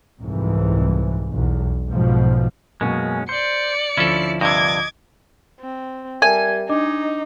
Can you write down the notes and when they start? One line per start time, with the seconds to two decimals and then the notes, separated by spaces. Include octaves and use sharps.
0.21 C2 F2 G#2 E3
1.32 B1 E2
1.90 B1 G#2 B2 F3
2.81 F#2 B2 G#3 A#3 C#4
3.29 C5 D5 G6 C#7
3.97 D2 F3 C#4 E4 A4
4.41 G2 C3 D#5 D6 G#6
5.60 C4
6.22 G3 A#4 E5 G#5
6.69 D4 D#4 D#5 D6